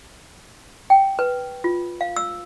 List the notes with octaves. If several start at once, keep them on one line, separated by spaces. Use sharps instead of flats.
G5
B4
F4
F5
E6